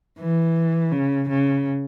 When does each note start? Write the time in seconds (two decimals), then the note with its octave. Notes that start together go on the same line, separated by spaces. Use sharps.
0.19 E3
0.92 C#3
1.29 C#3